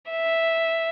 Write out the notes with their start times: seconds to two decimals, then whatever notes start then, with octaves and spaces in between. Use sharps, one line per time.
0.10 E5